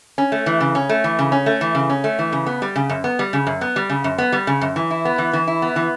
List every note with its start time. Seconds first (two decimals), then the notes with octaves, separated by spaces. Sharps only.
0.18 C#4
0.32 A3
0.46 E3
0.61 C#3
0.75 C#4
0.89 A3
1.04 E3
1.19 C#3
1.32 C#4
1.46 A3
1.61 E3
1.75 C#3
1.90 C#4
2.04 A3
2.19 E3
2.32 C#3
2.46 B3
2.62 G3
2.76 C#3
2.90 F#2
3.04 B3
3.19 G3
3.33 C#3
3.47 F#2
3.61 B3
3.76 G3
3.89 C#3
4.04 F#2
4.18 B3
4.32 G3
4.47 C#3
4.61 F#2
4.76 E3
4.91 E4
5.05 B3
5.18 E3
5.33 E3
5.47 E4
5.62 B3
5.76 E3